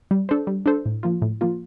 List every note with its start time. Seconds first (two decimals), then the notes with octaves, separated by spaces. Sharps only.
0.11 G3
0.29 D4 A4 C5
0.47 G3
0.66 D4 A4 C5
0.86 A2
1.03 F3 A#3 F4
1.22 A2
1.41 F3 A#3 F4